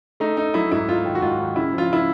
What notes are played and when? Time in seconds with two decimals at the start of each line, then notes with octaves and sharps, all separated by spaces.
0.20 A3 D#4
0.37 A3 D#4
0.54 F#3 E4
0.72 G#2 E4
0.88 G#2 F4
1.05 D#3
1.15 F#4
1.22 G#2 F4
1.39 D#3
1.56 C#3 E4
1.73 F3
1.78 F4
1.90 C#3 E4